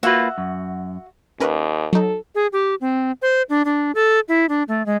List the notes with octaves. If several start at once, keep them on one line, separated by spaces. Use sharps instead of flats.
A#3 F4 F#4 B4 E5
F#2
D#2 C#4 A#4 B4
F#3 D#4 A4
G#4
G4
C4
C5
D4
D4
A4
E4
D4
A3
G#3